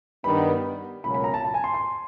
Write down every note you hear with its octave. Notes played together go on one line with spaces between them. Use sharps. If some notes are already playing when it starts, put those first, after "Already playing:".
G2 D#3 G3 B3 B5
C#2 B2 F#3 A#3 C#4 B5
B5
A#5
A5
A5
G#5
C6
C6